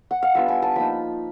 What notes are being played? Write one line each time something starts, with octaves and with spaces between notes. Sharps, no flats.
F#5
F5
G3 B3 D4 F4 E5
G#5
A5
F3 A#3 D#4 B5